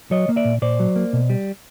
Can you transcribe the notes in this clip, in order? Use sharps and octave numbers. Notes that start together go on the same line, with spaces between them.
F#3 C#5 D#5
A#3
D5 E5
A#2
A#2 C5 D5
F#3
A#3
B2
G3